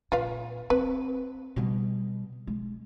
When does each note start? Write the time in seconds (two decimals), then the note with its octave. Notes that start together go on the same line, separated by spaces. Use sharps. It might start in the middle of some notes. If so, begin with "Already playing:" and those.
0.12 A#2 F4 B4 F5
0.70 C4 B4
1.56 B2 G3
2.47 G#3